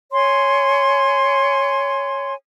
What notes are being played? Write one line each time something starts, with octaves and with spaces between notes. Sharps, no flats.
C#5 G#5 C6